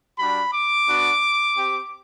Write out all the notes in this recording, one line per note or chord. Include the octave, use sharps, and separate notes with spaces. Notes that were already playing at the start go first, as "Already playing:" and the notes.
G3 D4 F#4 B5
D6
B3 D4 F#4
C4 G4